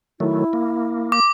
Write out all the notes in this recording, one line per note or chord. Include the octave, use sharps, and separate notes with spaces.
D#3 F#3 A3 E4
A#3
D6